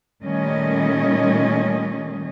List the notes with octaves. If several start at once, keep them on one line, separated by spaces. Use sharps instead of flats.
A#2 D#3 G3 A3 C#4 D#5